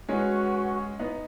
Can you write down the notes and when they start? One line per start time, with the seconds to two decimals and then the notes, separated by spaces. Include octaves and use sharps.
0.09 G#3 C#4 F#4 B4 F#5 C#6
1.00 B3 D#4